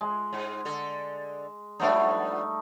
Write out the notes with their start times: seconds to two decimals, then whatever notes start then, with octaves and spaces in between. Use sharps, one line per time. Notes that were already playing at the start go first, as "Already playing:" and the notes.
0.01 G#3
0.33 G#2
0.65 D3 A4
1.80 F3 G3 A3 B3 D4 D#4